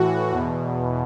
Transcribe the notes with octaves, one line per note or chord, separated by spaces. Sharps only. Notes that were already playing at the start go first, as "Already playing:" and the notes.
Already playing: A2 E3 F#4
E2 B2